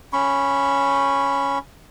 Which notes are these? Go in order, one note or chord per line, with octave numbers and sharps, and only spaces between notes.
C#4 B5 C#6